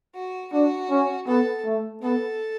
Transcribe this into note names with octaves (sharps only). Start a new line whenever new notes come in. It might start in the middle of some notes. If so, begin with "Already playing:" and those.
F#4
D4 F#4
C#4
B3 A4
A3
B3 A4